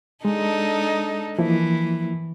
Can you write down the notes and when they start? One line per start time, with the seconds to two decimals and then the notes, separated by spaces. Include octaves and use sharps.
0.25 G#3 D4 D#4 A4
1.38 E3 F3 A#3 E4